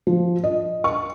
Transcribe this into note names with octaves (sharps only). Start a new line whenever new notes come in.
F3
D#5
C#6